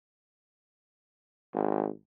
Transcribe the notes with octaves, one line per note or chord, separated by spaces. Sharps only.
G#1